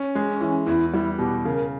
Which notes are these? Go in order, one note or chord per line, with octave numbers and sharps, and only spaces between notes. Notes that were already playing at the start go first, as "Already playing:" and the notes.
Already playing: C#4
G#3
C#4
E3
E2 E4
G3 E4
B2 G4
C#3 A#4